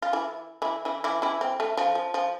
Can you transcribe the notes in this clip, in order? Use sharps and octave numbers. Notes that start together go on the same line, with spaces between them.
F4
E3 E4
E3 E4
E3 E4
E3 E4
E3 E4
C4
A3
F3
F3
F3